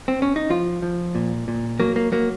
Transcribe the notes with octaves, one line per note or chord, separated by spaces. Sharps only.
C4
C#4
D#4
F3 F4
F3
A#2
A#2
F#3 A#3
A#3
F#3 A#3